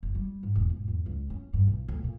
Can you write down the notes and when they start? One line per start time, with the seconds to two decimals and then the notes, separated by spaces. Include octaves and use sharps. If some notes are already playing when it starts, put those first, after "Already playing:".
0.03 F#1
0.15 G3
0.43 G#2
0.55 E1
0.70 G#2
0.88 E2
1.06 C#2
1.30 C#4
1.53 G2
1.67 B1
1.88 D2
2.04 A#2